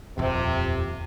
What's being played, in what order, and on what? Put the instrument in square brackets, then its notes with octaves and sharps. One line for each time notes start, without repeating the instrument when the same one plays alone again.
[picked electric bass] D#1 F2 [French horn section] C3